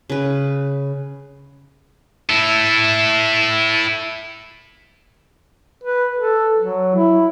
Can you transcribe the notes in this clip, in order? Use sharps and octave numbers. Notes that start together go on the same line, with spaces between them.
C#3 B4
E4 A4
B4
A4
F#3
E4